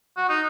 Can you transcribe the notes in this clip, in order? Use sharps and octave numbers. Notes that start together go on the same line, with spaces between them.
F#4
D#4